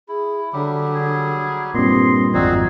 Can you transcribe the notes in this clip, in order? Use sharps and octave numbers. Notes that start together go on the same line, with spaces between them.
E4 G#4
D3 F#3 G3 G4
G#4
G2 A#2 C4 D#5 C6
G#1 F2 F3 C4 D#4 F#4 G#4 D5